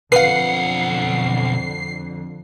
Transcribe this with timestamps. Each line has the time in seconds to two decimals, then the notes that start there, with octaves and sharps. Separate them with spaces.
0.12 B1 F2 D3 B4 F5 F#5 C7